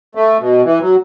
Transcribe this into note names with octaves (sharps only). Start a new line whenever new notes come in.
A3
B2
E3
F#3